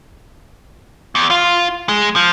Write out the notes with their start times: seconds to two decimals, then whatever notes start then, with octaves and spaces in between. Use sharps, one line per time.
1.15 E2
1.30 F4
1.89 G#3
2.16 F3